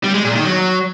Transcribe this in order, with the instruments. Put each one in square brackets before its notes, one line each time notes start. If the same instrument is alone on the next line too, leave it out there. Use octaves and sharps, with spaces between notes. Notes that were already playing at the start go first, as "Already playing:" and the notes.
[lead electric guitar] G3
G#3
A#2
D#3
F#3